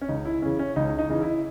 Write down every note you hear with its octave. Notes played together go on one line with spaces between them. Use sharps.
C#4
C#2 D#4
E4
C#3 E3 C#4
C#4
C#2 D#4
D#4
C#3 E3 D#4
E4